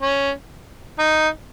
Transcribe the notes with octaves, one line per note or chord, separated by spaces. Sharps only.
C#4
D#4